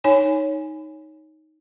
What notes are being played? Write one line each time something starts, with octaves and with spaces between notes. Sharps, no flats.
D#4 C#5 G#5